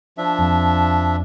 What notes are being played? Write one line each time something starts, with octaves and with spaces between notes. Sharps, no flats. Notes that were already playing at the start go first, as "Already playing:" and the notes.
F3 D4 E5
F2